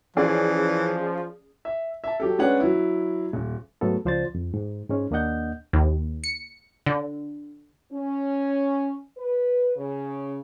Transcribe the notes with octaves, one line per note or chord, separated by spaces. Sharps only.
E3 F3 C#4 G#4 D5
E5
E5 A5
F#3 G4 A4
G#3 C#4 D4 B4 C#5 F#5
F#3 E4
D#1
G#2 F#3 A3 B3 A4
C#2 F3 C5 D5 A6
F2
G#2
G#2 G#3 C#4
D#2 A#3 D4 D#5 F#5 G6
D#2
C#7
D3
C#4
B4
C#3